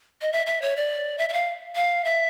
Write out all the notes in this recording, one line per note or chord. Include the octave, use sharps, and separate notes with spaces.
D#5
E5
E5
C#5
D5
E5
E5
F5
F5
E5